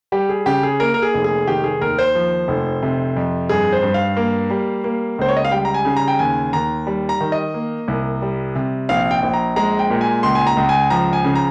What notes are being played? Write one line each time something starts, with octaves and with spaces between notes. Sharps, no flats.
G3 G4
G#4
C#3 G4
G#4
A#3 A#4
A#4
G#4
F1
G#4
D#3 G4
G#4
D#2 A#4
C5
F3
F1
C3
F2
G2 G#4
C5
G2
F5
A#3
G3
A#3
C#2 C5
C#5
D#5
F5
G3 G5
A#5
G#5
C#3
A#5
G5
D#2 G#5
D#2 A#5
G3
A#5
D#3
D#5
A#3
C2
G3
C3
A#1 F5
G5
A#1
A#5
G#3 A#5
G5
A#2
G#5
C#2 C6
G#5
A#5
C#2
G#5
F3 A#5
G#5
C#3
A#5